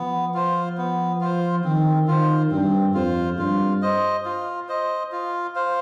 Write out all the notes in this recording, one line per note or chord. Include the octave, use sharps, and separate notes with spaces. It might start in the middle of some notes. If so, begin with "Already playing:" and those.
Already playing: F3 B3
F4 C5
B3
F4 C5
D#3 C4
D#3 F4 C5
G2 C4
F2 F4 C5
G2 F4
C5 D#5
F4
C5 D#5
F4
C5 F5